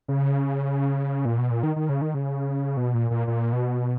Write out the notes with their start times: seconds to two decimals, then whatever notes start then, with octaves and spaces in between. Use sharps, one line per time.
0.08 C#3
1.25 A#2
1.38 B2
1.50 A#2
1.63 D#3
1.76 D#3
1.89 C#3
2.02 D#3
2.14 C#3
2.77 B2
2.94 A#2
3.11 A#2
3.27 A#2
3.53 B2